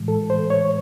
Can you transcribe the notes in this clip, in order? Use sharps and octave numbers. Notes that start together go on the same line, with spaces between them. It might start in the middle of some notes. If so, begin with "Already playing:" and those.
Already playing: A2 E3 G#3
A4
C5
C#5